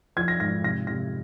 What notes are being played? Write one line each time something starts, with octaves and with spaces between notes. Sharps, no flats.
F3 G#6
A#6
G#2 A#6
C3 A#6
C3 A#6